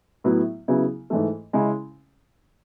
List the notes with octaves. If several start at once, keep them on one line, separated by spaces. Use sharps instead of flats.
A2 F#3 B3 E4
C#3 F#3 B3 E4 G#4
G#2 E3 A3
C#3 G#3 C#4 E4